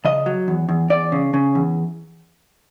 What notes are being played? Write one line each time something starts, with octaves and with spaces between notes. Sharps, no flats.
C#3 D#5
F#3
E2
E2
E2 D5
C#3
C#3
E2